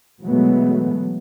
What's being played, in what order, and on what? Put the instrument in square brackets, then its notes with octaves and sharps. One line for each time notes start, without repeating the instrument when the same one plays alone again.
[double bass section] B2 E3 F#3 G#3 A3 B3